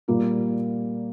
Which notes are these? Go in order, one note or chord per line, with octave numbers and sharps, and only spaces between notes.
A#2 G3 A#3 F4